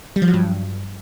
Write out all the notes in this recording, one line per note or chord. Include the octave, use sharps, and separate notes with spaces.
G3
F3
F#3
G2